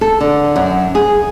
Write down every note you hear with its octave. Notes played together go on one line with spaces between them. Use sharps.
A4
D3
F#2
G#4